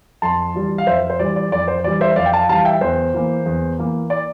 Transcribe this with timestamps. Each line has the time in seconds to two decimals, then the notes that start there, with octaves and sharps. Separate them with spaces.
0.22 F2 A5 C6
0.55 E3 G3
0.78 F5
0.87 F2 C5 E5
1.10 C5
1.19 E3 G3 D5
1.36 D5
1.51 F2 D5
1.68 C5
1.84 E3 G3 D5
2.01 C5 E5
2.16 F2 D5 F5
2.26 G5
2.33 F5 A5
2.49 E3 G3 F5 A5
2.65 E5 G5
2.81 E2 C5
3.14 E3 A#3
3.46 E2
3.79 E3 A#3
4.10 D5